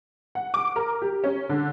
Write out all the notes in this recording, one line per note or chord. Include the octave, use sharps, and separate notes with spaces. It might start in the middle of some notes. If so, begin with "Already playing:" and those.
F#5
D6
A#4
G4
C#4
D3